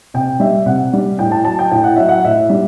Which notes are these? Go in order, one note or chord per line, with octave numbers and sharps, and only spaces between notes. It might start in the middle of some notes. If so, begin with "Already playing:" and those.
C3 G5
G3 E5
C3 F#5
G3
A2 G5
A5
F#3 A5
G5
A2 G5
F#5
F#3 E5
F#5
A2 E5
G3